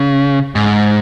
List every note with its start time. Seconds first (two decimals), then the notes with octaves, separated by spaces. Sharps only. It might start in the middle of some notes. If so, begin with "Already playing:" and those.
Already playing: C#3
0.55 G#2